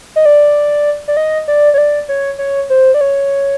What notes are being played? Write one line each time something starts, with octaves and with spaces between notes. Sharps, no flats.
D#5
D5
D5
D#5
D5
C#5
D5
C#5
C#5
C5
D5
C#5